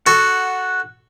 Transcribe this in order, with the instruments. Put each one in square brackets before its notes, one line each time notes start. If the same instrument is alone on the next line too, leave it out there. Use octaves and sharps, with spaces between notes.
[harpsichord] F#4 A4 [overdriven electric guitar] F#5